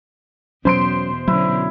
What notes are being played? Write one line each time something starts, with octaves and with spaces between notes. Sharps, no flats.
E2 B2 F#3 B3 C#4 C5 C6 D7
B2 D3 F#3 C#4 E4